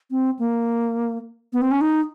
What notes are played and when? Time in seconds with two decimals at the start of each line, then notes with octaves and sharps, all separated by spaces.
0.11 C4
0.39 A#3
1.53 B3
1.62 C4
1.71 C#4
1.81 D#4